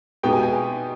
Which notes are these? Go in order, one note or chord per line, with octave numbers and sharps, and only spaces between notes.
B2 G#3 B3 D#4 G4 G5
G#5
G#5